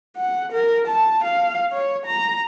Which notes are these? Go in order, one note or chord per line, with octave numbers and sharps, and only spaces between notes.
F#5
A#4
A5
F5
C#5
A#5